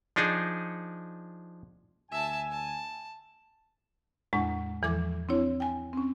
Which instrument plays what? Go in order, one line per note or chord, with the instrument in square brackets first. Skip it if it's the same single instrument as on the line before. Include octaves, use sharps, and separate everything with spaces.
[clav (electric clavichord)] F3 D4 D#4 G#4
[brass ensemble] D2 G#5 [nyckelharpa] E5 A5
[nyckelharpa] A5
[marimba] E2 A2 G#3 D4 F#5 A#5
E2 E3 F3 A4 D6 G#6
C4 D4 E4 C#5
G5 G#5
C4 C#4